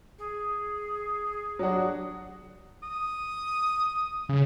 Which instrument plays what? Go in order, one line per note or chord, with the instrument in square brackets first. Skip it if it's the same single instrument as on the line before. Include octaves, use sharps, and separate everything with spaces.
[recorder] G#4
[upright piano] F#3 D4 F#4
[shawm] D#6
[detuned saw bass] C#3